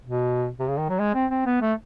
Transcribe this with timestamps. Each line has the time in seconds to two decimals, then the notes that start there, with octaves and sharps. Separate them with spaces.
0.05 B2
0.59 C3
0.68 C#3
0.78 D#3
0.89 F#3
0.99 G#3
1.15 C4
1.31 C4
1.46 B3
1.62 A3